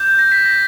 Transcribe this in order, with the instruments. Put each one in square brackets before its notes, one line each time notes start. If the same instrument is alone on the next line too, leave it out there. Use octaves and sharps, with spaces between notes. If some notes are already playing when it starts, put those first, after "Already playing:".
Already playing: [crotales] D6 G6
A#6
B6
A#6